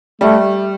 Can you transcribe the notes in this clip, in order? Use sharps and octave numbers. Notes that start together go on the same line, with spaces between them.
G3 A3